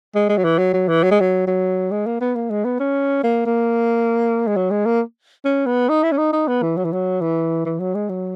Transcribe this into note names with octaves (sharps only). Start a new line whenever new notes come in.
G#3
G#3
F#3
E3
F#3
F#3
E3
F#3
G#3
F#3
F#3
G#3
A#3
B3
A#3
G#3
B3
C#4
A#3
A#3
G#3
F#3
G#3
A#3
C#4
B3
D#4
E4
C#4
D#4
D#4
B3
E3
F#3
E3
F#3
E3
E3
F#3
G#3
F#3